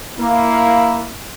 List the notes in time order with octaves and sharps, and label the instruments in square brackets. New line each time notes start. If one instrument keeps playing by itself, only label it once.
[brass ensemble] A#3 E4